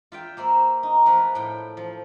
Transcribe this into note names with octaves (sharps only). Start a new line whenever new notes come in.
F4 E5 G5
A#3 C5 E5 B5
D#4
F3 A3 F4 B4
A2 G5
F3